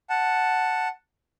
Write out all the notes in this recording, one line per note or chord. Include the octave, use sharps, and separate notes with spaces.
F#5 A5